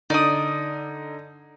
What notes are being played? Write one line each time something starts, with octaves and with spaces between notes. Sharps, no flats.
D3 D#4 D5 D#6